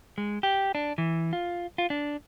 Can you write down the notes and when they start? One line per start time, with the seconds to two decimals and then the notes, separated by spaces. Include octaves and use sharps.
0.18 G#3
0.43 G4
0.75 D4
0.98 E3
1.33 F4
1.78 F4
1.90 D4